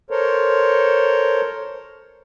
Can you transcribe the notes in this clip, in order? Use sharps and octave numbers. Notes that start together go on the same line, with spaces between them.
A4 A#4 C5 C#5